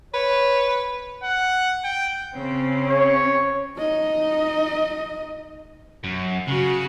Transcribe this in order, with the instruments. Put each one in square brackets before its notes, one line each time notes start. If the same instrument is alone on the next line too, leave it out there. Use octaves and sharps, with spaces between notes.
[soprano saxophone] B4 [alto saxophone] C#5
[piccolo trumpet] F#5
G5
[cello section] C#3 C4 C#4
[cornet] C#5
[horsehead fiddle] D#4 D#5
[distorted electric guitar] F#2
[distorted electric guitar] C#3 [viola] F#4